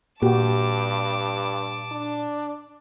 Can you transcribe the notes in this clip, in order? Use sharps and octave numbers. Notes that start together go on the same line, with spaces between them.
G2 A#2 A#3 F#4 G4 A5 D6
D4